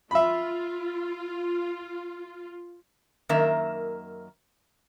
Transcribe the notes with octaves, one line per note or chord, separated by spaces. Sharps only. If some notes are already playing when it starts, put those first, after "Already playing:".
F4 E5 B5
F#2 D#3 A#3 A#4 E5